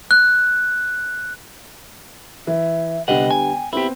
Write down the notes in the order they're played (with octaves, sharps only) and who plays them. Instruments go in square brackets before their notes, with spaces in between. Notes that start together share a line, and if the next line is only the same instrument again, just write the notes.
[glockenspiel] F#6
[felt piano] E3 [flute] E5
[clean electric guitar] C2 D#5 F#5 [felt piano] D3 G3 B3 [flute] G5
[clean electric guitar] G#5
[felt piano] B3 C4 [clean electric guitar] E4 G4